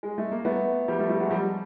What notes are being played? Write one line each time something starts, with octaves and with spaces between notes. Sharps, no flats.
G#3
A3
A#3
A3 B3
F3 G3
G3 A3
G3 A3
F#3 G#3
F3 G3